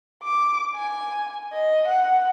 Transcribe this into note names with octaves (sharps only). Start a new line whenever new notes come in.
D6
G#5
D#5
F#5